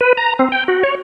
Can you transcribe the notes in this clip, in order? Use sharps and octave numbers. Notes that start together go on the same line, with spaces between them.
B4
A#5
C4
G5
F#4
C#5